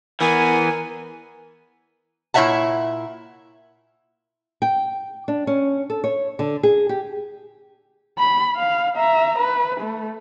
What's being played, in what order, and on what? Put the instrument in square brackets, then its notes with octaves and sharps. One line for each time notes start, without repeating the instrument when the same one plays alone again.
[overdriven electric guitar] E3 B3 [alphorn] A#4 [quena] G#5
[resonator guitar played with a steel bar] A#2 E4 C#5 E5 F#5 A5
[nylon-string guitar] G5
D4
C#4
A4
C#5
D3
G#4
G4
[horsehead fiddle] B5
F5
E5 A#5
B4
A3